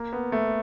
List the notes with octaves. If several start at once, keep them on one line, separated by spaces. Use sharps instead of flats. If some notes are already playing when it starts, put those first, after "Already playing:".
Already playing: A#3
B3
A3